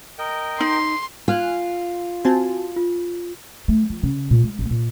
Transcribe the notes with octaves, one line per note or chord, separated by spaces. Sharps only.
A#4 D#5 G5
D#4 C6
F4 G#5 F6 F#6
C4 F#4 G#5 A5
F4
A3
F3
C#3
A#2
G#3
A1
A#2